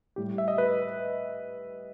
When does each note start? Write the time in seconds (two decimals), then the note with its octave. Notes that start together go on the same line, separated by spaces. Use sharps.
0.16 A2 G3 G4
0.38 E5
0.48 D#5
0.58 B4